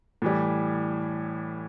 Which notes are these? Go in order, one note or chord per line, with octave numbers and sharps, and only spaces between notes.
A2 E3 G3